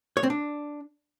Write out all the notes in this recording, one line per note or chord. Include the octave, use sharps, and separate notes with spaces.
C#5
C4
D4